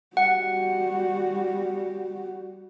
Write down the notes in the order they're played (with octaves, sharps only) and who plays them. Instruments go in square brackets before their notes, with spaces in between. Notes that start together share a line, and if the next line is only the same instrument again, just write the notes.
[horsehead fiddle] G3 F#4 [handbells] F#5